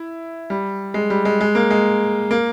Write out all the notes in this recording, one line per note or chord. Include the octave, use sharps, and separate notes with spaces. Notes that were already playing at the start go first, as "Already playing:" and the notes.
Already playing: E4
G3
G#3
G3
G#3
G#3
A#3
G#3
A#3